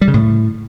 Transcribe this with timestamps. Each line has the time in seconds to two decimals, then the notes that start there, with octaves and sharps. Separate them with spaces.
0.01 G3
0.08 C#3
0.14 A2